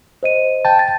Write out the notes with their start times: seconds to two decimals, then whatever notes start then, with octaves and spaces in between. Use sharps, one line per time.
0.23 C5 D#5 D#7
0.65 G5 A5
0.79 A6